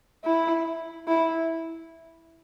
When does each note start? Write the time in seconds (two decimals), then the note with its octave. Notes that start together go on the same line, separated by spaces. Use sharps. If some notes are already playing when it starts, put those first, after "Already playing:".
0.25 E4
1.08 E4